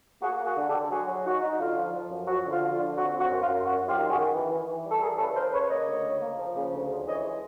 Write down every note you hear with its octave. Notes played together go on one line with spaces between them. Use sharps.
A#3 F#4 G#4
A#3
F#4 G#4
D3
G4 A4
D3
F#3 F#4 G#4
F#3
D#4 F#4
D#4
D3 F4
F3
F3
F#2
F3 F#4
D3
F4
F3
F4
D3
C4 F#4
C4
F#4
F#2
F4
F#2
F#2 F#4
F#2
F4 G4
D#3
F#4 G#4
D#3
E3
E3
E3
G3
A4
E3 G#4 A#4
C#3 A4 B4
C#3 A#4 C5
C#3 B4 C#5
A#3 C#5 D#5
D2
C#3
A#3
F3
C#3
D2
F3
E3 C#5 D#5
G#3